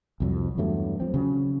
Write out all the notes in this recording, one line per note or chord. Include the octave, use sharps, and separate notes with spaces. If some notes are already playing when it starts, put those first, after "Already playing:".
C2 F2 F#3
E2 G2 F#3 A3
F3 C4
C#3 F#3